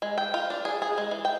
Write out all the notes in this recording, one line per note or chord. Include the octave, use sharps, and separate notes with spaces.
G#3
G5
F4
D4
G#4
G#4
G#3
E3
G5